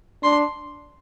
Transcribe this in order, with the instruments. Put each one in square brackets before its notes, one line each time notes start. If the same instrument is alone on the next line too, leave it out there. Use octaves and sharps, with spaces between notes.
[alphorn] D4 [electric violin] C6